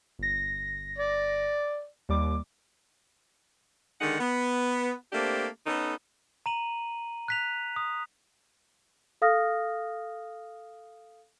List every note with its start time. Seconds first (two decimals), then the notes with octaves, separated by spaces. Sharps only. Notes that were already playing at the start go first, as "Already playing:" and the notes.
0.19 G1 A#6
0.98 D5
2.09 D#2 G3 D6
4.01 D3 D#3 G#3 D#4 F#5
4.20 B3
5.13 A3 A#3 C4 D4 G4
5.66 B3 C#4 D#4 A4
6.46 A#5 D#7 F#7
7.28 F#6 B6 F7
7.76 D#6
9.22 A4 F5 D#6 F6 A#6